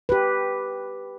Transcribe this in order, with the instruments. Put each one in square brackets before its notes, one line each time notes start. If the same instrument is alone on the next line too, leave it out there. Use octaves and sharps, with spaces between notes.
[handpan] G4 B4